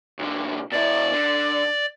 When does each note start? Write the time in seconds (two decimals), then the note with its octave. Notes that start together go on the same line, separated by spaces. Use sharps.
0.19 B1 D3
0.72 B2 E4 D5
1.13 D3